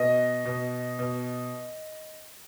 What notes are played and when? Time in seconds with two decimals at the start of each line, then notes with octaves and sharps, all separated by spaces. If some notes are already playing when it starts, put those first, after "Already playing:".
Already playing: B2 D#5
0.45 B2
0.99 B2